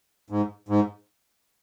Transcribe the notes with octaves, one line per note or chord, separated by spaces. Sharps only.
G#2
G#2